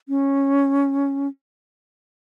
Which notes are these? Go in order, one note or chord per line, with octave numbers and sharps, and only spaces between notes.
C#4